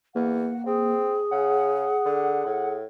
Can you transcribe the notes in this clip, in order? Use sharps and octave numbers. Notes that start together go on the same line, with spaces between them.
E2 A#3 F#5
C4 G#4
C#3 F#5
D3
A2